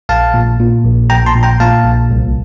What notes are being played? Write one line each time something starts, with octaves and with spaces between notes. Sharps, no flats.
A#1 F5 A5
A#2
A#2
A#1
A#1 G5 A#5
A5 C6
A#2
G5 A#5
A#2 F5 A5
A#1
C2